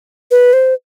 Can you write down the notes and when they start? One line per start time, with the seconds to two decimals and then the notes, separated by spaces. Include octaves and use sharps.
0.31 B4
0.53 C5